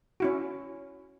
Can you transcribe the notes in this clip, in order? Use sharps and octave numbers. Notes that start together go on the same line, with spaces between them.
C#4 E4 F#4